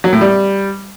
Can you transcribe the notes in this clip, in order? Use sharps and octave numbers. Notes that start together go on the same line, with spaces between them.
F#3
A2
G3